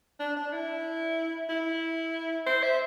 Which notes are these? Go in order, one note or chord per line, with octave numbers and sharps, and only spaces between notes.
D4
D4
E4
E4
C5
E5